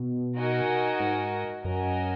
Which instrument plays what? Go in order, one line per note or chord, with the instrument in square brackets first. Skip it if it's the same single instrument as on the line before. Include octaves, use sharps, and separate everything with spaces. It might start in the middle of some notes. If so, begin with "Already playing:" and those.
Already playing: [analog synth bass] B2
[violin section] D#4 F#4 A#4 D#5 G#5
[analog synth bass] G#2
[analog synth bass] F#2 [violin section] C#4 F#4 A#4 D#5 G#5